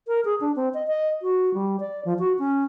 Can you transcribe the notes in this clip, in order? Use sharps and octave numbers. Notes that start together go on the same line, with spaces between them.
A#4
G#4
D4
C4
D#5
D#5
F#4
G3
D5
F3
F#4
C#4